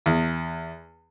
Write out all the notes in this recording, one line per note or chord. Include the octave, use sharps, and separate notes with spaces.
E2